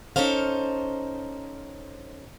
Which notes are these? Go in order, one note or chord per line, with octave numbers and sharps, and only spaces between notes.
C#4 D#4 A4 C5 F5